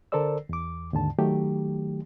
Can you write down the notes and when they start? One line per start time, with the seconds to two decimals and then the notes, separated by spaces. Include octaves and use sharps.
0.12 D3 A4 A#4 C5 D5 E6
0.49 E2 D6
0.93 D#2 G#2 D3 A5
1.19 D#3 F#3 A3 G4